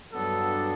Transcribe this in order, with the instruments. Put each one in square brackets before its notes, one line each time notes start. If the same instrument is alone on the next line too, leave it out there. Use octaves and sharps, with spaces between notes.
[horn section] G2 F#3 B3 D4 A4